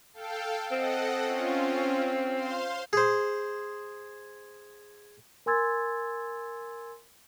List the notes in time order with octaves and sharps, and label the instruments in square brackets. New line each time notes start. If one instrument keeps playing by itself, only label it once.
[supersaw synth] A4 F5 G5
[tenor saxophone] C4 [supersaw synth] A4 D#5 F#5
[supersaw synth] C#4 F4
C5 F5 C6
[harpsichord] G#4 C5
[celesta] A#4 G#5 C6 E6 G#6 A6